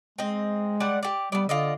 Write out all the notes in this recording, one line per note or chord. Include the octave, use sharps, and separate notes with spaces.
G#3 C4 D#5
G3 D5 F#5
G4 D5
G3 B3 D5
D3 F4 D5 D#5